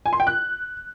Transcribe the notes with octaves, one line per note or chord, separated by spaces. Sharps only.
G#5
C6
G5
F#6